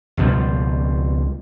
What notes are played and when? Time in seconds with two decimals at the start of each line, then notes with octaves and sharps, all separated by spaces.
0.17 C#2 B2 F3 G3